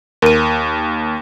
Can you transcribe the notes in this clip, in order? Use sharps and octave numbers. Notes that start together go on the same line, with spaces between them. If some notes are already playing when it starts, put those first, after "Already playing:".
D#2 A#4 D#7